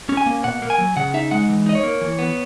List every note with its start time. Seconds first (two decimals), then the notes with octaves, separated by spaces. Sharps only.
0.09 C#4
0.17 G#5
0.26 A#3
0.44 B2 F#5
0.62 A#3
0.70 G#5
0.78 F#3
0.97 C#3 F#5
1.14 D#4 E5
1.31 G#3 F#5
1.49 E3
1.66 D#4 D#5
1.75 C#5
1.84 A#3
2.01 E3
2.19 B3